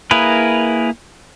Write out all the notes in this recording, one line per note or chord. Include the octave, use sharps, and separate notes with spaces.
A#3 E4 G#4 A#4 B4